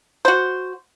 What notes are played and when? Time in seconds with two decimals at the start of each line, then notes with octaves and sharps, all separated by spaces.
0.25 F#4 C5